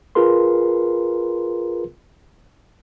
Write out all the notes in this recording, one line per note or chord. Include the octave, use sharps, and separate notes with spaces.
F4 G#4 A#4 B4 C6